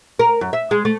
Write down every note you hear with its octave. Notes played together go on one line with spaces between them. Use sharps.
A#4
F#2
E5
G#3
A3